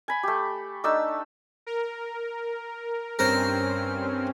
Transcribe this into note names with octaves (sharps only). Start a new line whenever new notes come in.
G#5 B5
A3 G4
A3 D4 D#4 E6
A#4
G2 C4 C#4 A#4 C5